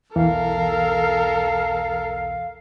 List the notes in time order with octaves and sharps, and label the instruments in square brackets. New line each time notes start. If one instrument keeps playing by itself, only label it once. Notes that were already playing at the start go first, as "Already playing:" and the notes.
[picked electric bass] B1 E2 [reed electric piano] E3 [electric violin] A4 A#4 [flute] F5